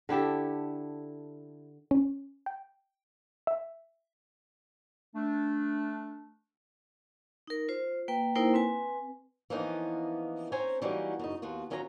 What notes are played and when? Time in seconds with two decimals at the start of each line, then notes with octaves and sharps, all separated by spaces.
0.09 D3 E4 G4 A4
1.91 C#4
2.46 G5
3.47 E5
5.15 A3 D4
7.47 D#4 A#4
7.68 F4 C5
8.08 A#3 B4 G5
8.35 A#3 D#4 E4 A#4 C5 G5
8.54 C4 B4 G#5
9.50 E3 F3 A#3 B3 C#4 D#4
10.52 C4 C#4 C5 G#5 A#5
10.82 E3 F#3 G3 A#3 C#4 D#4
11.19 F#2 C#3 D#4
11.42 D#2 B3 F4 F#4
11.70 D#3 F#3 C#4 F4 E5 A#5